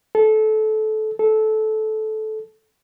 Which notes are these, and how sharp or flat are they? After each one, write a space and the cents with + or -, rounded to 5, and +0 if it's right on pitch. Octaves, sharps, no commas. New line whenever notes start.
A4 -20
A4 -15